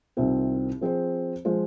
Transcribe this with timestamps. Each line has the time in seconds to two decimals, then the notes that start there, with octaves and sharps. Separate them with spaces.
0.17 C2 C3 D#3 C4 F4
0.81 F3 C4 G#4 C5
1.45 F3 G#3 F4 C5